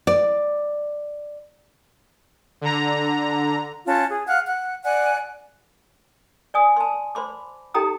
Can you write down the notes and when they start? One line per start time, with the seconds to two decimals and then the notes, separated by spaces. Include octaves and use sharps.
0.07 D5
2.61 D3 A#5
3.86 C#4 F4 A5 F#6
4.10 G#4
4.28 F5 F#5 F#6
4.46 F#5 F#6
4.84 D5 F#5 G#5 F#6
6.54 D5 G#5 D#6
6.76 A5 C6
7.15 C5 B5 C6 D6
7.74 D#4 G4 A4 G5 A#5 D#6